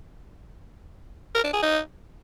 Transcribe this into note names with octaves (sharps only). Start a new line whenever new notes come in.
A#4
D4
G#4
D#4